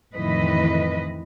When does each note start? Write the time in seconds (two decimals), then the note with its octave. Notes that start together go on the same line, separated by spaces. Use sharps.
0.14 F2 A2 D#3 E3 B4 D#5